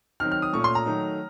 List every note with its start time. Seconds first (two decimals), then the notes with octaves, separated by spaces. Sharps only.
0.20 D#3 F#3 C4 D#4 F6
0.32 F6
0.42 D#6
0.53 A#2 A3 C#4 C#6
0.64 C6
0.75 A#5
0.86 D#3 F#3 A3 D#4